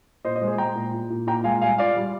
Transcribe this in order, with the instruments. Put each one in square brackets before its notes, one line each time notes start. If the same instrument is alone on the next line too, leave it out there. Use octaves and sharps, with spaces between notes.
[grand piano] A#2 C5 D#5
C5 D#5
G#3
G#4 C5
G#3 G5 A#5
A#2
A#2
A#2
A#2 G5 A#5
G#3 F5 G#5
G3 F5 G#5
F4 D5 F5
G3